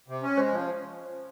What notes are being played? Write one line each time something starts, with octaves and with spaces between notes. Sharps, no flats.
C3
C#4
G#3 C5
F3